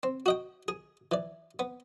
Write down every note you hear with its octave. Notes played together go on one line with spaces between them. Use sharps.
C4
F#4 D#5 G5
G#4
E3 D5
B3